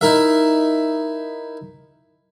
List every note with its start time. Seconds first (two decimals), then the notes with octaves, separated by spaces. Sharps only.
0.01 D#4 E4 A#4 E5